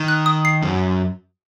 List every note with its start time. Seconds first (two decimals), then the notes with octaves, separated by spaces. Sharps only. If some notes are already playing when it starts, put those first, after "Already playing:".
Already playing: D#3
0.08 F#6
0.26 D#6
0.45 C7
0.63 F#2